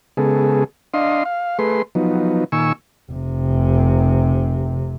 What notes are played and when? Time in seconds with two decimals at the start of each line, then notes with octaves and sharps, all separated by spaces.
0.17 C#3 G#3 B3 G#4 A4
0.94 D4 D#5 F5 C6
1.25 F5
1.59 A3 G#4 B4 C6
1.95 F3 F#3 B3 D#4
2.52 A#2 D#3 G#5 C#6 E6
3.12 F1 C3